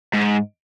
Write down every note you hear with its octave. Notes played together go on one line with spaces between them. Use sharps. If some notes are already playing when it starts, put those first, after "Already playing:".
G#2